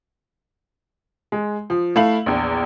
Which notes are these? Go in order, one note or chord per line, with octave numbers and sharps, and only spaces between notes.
G#3
F3
A3 E4 F5 F#7
A#1 E2